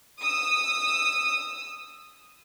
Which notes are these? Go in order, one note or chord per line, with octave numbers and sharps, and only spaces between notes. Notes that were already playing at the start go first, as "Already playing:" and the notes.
D#6 E6